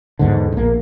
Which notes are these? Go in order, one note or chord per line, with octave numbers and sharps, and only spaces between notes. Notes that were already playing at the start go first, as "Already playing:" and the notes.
E2 G#2 D3
A#1 A#3